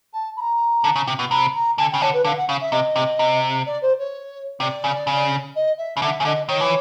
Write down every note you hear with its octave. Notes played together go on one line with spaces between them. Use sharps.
A5
B5
A#5
D3
C#3
C3
B2
C3 B5
A#5
D3 G#5
G5
C#3
D3 C#5
B4
D3 F5
F#5
C#3 F5
E5
C3 D#5
C3
C3
D5
C5
C#5
C3 D5
C#3
C#3
D#5
E5
C#3
D3 E5
C#3
D3 D#5
D#3 C#5
E3